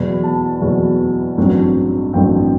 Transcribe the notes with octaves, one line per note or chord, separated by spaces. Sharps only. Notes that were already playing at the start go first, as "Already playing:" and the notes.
Already playing: E2 B2 F#3 B5
A5
E2 B2 F#3
A1 G2 F#3 C4
A1 G2 F#3 C4 G5